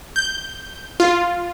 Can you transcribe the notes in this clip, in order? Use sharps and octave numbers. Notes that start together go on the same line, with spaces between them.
G6
F4